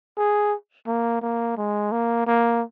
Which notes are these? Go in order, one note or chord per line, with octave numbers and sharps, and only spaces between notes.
G#4
A#3
A#3
G#3
A#3
A#3